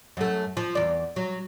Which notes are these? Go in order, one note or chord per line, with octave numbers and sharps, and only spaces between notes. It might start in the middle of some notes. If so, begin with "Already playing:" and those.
F#2 A3
F3
E2 D5
F#3